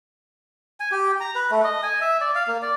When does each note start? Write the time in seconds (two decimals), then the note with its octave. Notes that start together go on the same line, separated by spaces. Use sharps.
0.80 G#5
0.92 G4
1.20 A#5
1.35 B4
1.51 A3
1.64 D#5
1.83 G#5
2.01 E5
2.21 D5
2.35 F5
2.47 A#3
2.62 D5